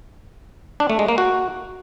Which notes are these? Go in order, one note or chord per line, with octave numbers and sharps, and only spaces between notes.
D4
A3
G#3
A#3
F#4